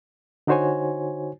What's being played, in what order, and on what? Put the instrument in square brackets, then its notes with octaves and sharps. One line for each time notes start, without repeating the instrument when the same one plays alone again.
[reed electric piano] D3 D#4 F#4 C5 C#5 G#5